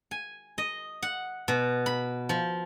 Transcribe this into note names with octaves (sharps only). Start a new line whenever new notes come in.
G#5
D#5
F#5
B2
B5
F3